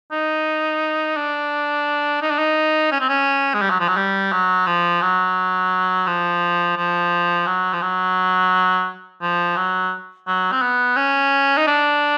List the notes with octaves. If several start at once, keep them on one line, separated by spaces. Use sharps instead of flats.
D#4
D4
D#4
D4
D#4
C#4
C4
C#4
G#3
G3
F#3
F3
F#3
G3
F#3
F3
F#3
F3
F3
F#3
F3
F#3
F3
F#3
F#3
C4
B3
C#4
D#4
D4